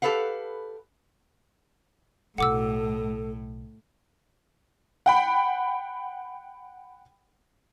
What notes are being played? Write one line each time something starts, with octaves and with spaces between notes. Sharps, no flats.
G4 A4 B4 F5 F#5
B1 A2 E4 A4 F#5 D6 E6
F#5 G5 B5